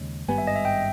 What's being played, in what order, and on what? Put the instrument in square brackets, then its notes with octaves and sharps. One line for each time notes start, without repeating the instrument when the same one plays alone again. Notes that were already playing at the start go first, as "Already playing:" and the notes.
Already playing: [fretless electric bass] D#2 C#3 G#3 C#4
[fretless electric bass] G#1 G2 G3 B3 [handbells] G#5
[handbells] E5
D#5
E5
G5